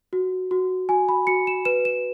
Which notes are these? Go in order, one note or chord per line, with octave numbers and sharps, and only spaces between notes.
F#4
F#4
F#4 G#5
B5
F#4 C#7
E7
B4 E7
E7